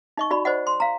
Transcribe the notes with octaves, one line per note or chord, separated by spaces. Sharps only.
D#4 D#5 C#6
D#4 F#4 D5 B5
C5 D5 D#5 F#5
C6
F5 A#5